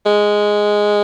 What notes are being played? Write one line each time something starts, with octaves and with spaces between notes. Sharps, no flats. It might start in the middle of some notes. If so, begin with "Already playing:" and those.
G#3